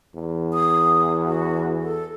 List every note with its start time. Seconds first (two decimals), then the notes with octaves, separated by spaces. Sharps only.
0.14 E2
0.53 D#6
1.25 F#4
1.82 A4